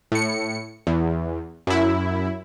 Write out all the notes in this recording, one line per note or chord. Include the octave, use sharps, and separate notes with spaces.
A2 C#7
E2
F#2 E4